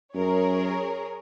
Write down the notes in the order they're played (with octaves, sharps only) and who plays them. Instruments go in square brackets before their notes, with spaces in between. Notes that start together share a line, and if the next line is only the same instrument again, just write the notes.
[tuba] F#2 [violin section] G#4 A#4 C#5